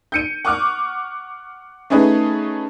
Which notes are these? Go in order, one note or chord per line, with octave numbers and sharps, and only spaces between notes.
G6 C#7 D#7
F#5 C#6 D6 F6
A3 C#4 D#4 G#4 B4